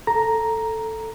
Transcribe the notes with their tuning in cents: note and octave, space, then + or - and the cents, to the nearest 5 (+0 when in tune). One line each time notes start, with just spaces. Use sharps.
A4 +0 A#5 +0